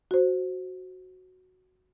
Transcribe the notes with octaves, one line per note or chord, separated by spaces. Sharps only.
F#4 C5